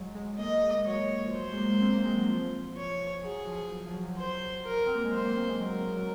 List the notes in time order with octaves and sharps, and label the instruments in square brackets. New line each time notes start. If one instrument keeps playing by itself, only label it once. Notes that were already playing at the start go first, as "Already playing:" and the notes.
Already playing: [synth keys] F#3 G#3
G#3
[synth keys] A#3 [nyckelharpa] D#5
[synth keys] G#3
A#3
G#3
[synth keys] F#3 [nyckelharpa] C#5
[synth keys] F#3
F3
[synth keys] F#3 [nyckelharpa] C5
[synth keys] G#3
A#3
A#3
C4
A#3
G#3
F#3
F3
[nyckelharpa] C#5
[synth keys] F#3 [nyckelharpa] G#4
[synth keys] F3
F#3
F3
F#3
[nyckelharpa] C5
A#4
[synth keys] C4
A#3
G#3
[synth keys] F#3 [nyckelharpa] C5
[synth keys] A#3
C4
G#3
[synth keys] F#3 [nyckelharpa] A#4
[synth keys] G#3
F#3